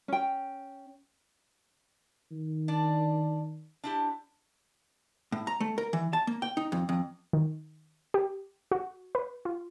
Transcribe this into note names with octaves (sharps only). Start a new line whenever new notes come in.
C#4 G5
D#3
D4 D5
D4 E4 G4
A2
A#5
A3
A#4
E3
A5
A#3
G5
D#4
F2
F2
D#3
G4
F#4
B4
F4